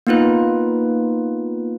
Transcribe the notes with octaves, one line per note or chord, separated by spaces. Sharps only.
A#3 B3 D#4 F4 B4